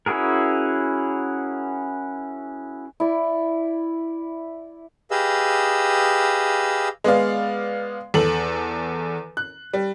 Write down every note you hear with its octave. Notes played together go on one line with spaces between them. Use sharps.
C#4 E4 F#4 G#4 A#4
E4 D5
G4 G#4 B4 D#5 F5 E6
G#3 B3 D5 F5
E2 A4 F#7
F#6
G3